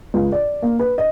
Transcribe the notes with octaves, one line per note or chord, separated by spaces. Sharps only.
C#2
D5
A#3
B4
D#5